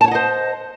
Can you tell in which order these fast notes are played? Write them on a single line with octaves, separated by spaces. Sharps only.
A5 C#5 F#5 D#5 C5